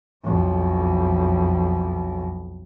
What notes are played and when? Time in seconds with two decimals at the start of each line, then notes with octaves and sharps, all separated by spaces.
0.23 B1 F2